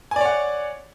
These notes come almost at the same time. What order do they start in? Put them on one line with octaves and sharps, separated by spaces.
G#5 D5 C#5 F#5